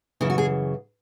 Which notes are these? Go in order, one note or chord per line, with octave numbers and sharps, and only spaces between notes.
F#2 C#3 E3 E4
F#4
G#4